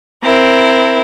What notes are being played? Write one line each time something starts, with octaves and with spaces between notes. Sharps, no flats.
C4 E4 A#4